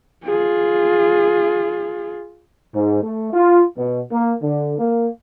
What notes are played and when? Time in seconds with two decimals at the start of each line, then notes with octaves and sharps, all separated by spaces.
0.24 F4 G#4
2.74 G#2
3.03 A3
3.33 F4
3.77 B2
4.12 A#3
4.42 D3
4.78 A#3